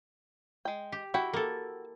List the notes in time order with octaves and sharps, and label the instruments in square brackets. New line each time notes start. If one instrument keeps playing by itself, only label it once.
[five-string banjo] G#3 G5
[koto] G4
[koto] E4 [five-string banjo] F#4 G5
[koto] A#3 A4